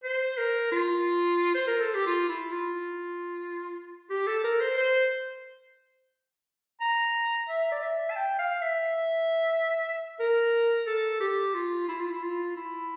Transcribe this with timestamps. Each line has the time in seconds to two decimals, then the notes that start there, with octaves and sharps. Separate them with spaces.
0.04 C5
0.37 A#4
0.72 F4
1.54 C5
1.67 A#4
1.80 A4
1.94 G4
2.07 F4
2.29 E4
2.52 F4
4.10 G4
4.27 A4
4.44 A#4
4.61 C5
4.78 C5
6.81 A#5
7.49 E5
7.72 D5
7.83 E5
8.11 A5
8.16 G5
8.39 F5
8.61 E5
10.20 A#4
10.87 A4
11.20 G4
11.54 F4
11.88 E4
12.00 F4
12.10 E4
12.22 F4
12.56 E4